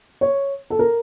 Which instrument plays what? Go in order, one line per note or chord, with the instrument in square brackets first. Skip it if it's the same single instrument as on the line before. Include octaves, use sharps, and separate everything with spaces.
[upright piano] C#5
A4
A#4